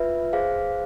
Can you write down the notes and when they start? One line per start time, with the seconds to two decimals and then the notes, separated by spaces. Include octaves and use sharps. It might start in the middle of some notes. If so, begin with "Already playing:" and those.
Already playing: F4 B4 E5
0.33 G#4 C5 F5